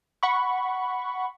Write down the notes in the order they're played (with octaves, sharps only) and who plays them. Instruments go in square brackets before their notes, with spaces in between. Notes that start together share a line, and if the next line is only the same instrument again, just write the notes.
[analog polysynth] F#5 B5 C#6